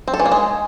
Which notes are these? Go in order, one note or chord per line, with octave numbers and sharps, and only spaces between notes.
C4
A4
E3
A#3
G#3